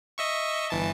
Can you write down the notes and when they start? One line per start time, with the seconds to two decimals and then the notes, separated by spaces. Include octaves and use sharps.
0.18 D#5 E5 C#6
0.70 G1 E3 A5